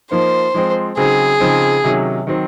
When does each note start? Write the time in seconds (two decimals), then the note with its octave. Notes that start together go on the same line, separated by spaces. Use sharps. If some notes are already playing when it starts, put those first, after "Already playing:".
0.11 F3 A#3 D#4 C5
0.54 F3 G#3 C4
0.97 C#3 F#3 C4 D#4 G#4
1.40 C#3 F3 C4 D#4
1.84 C3 D#3 F#3 C#4
2.27 D#3 F#3 C4